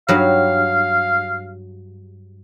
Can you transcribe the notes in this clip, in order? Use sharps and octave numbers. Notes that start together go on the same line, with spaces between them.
G2 F#3 F5